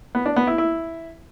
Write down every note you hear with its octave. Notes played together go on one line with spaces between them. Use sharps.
B3
D4
B3
E4
E4